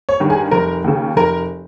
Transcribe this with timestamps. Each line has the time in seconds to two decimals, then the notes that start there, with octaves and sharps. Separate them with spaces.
0.09 C#5
0.20 G2 D#3
0.30 G#4
0.51 F1 A#4
0.84 D#2 C#3
1.16 F1 A#4